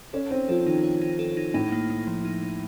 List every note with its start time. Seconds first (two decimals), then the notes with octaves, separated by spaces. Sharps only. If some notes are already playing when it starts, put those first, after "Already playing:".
0.13 C#4 A4
0.31 C4 D#4
0.49 F3 A4
0.66 D#3 D#4
0.84 C#5
1.02 D#4
1.19 A4
1.37 D#4
1.54 A2 D#4
1.72 A#3
1.90 A#3
2.07 F3
2.25 D#4
2.42 D#4